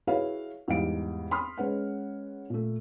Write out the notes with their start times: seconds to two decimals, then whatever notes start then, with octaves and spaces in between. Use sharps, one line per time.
0.07 E4 F#4 G#4 B4 C#5 F5
0.68 E2 G#2 G3 G4 F5 D7
1.31 B5 C6 D#6 F6
1.58 G#3 C#4 B4 F#5
2.50 A#2 A3